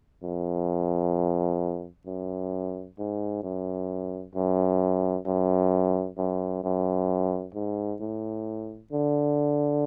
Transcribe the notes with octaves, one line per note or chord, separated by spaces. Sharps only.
F2
F#2
G#2
F#2
F#2
F#2
F#2
F#2
G#2
A2
D3